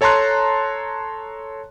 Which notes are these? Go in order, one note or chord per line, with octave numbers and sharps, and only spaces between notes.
A4 C#5 A5 A#5 C6 F#6